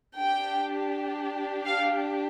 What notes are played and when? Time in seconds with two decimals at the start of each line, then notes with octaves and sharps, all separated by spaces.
0.18 D4 G4 G5
1.66 F5